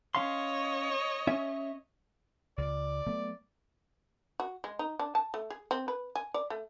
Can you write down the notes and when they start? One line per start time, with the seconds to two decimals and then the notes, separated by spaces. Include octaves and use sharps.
0.15 C#4 C#5 D#5 F5 C6
1.27 C#4 E5
2.57 C#2 D5
3.06 F#3 A3 B3
4.40 F#4
4.64 G#3
4.79 D#4
4.99 D4
5.15 A5
5.34 A3
5.50 G#4
5.71 C4
5.88 B4
6.16 G#5
6.34 D5
6.50 A3